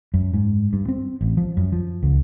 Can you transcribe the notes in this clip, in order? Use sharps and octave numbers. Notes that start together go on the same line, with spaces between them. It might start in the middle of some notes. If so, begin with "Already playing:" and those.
F#2
G#2
G2
C4
A1
F3
F#2
F3
C#2